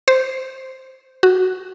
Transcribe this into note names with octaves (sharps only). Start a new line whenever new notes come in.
C5
F#4